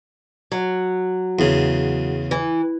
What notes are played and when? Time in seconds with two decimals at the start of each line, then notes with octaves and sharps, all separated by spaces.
0.52 F#3
1.39 E2 C#3
2.31 E3